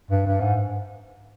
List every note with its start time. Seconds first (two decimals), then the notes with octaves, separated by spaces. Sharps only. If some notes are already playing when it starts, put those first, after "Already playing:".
0.11 G2
0.27 G2
0.41 G#2